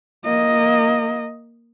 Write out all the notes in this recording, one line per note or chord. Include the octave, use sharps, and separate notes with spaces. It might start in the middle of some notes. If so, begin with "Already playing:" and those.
A#3 D#5